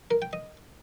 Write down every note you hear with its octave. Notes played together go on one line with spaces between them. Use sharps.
A#4
G5
D#5